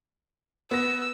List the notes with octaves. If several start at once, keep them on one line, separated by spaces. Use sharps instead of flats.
B3 E6 A#6